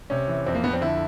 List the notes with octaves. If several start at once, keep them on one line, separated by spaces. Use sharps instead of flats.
C3 C#4
E3
F2 C4
A#3
F2 B3
C4
D3 E4